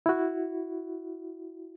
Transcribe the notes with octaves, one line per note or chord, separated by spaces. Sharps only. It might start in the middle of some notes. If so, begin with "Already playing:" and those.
E4 F#4